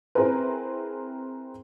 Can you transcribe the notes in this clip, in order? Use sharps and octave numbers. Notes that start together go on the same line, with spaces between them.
C4 E4 G#4 A#4 B4